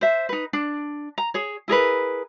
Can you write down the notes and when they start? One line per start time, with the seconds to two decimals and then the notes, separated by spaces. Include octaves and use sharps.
0.01 C5 E5
0.29 D#4 B4
0.53 D4
1.18 A#5
1.34 G#4 C#5
1.68 E4 G#4 A#4 B4